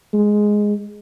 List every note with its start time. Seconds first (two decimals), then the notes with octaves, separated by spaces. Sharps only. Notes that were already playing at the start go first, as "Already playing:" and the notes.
0.14 G#3